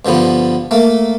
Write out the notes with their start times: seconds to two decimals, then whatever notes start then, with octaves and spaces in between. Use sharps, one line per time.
0.05 G2 D3 F3 B3
0.71 A3 A#3